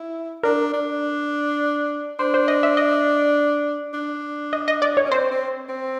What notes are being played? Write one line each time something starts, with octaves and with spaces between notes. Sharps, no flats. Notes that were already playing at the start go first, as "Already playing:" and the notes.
Already playing: E4
D4 A#4
D4
D4 C5
C5
D#5
E5
D#5
D4
D#5
D#5
D5
C#5
C#4
C4 C5
C4
C4